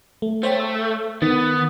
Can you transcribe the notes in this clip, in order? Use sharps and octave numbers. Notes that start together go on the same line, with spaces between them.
A3
A3 C5 C#5 G5
E6
D#3 B3 A6